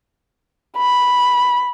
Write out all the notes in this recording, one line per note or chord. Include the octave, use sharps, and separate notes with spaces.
B5